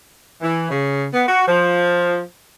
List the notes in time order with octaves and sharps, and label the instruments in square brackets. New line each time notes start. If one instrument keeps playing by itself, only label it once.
[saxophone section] E3
C#3
B3
F#4
F3